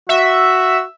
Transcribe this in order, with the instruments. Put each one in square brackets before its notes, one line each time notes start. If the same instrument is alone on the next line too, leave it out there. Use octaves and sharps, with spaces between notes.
[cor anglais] F#4 [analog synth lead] E5